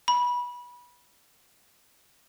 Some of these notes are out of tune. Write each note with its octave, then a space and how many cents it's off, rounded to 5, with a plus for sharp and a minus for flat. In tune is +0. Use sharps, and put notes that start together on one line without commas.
B5 -20